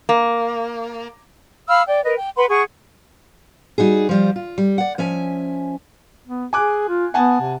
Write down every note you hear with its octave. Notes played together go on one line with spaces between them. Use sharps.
A#3
F5 B5 E6 F6
D5 G5
A#4 B4 D#5
G5
B4 F#5 B5 C6
G#4 F#5 C#6
G3 D#4 F#4 G#4
F3 G3 F4
F4
G3
D5 F#5
F3 C#4 E5 G#5
B3
G#4 G#5 D6 F#6
F4
B3 F#5 G#5 A5
C3